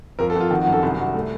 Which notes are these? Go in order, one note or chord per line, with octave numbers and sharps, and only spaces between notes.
F2 A#4
A4
F2
F4
D#3 F#4
F#4
F#2
A4
C2 F#4
C2 F#4
A3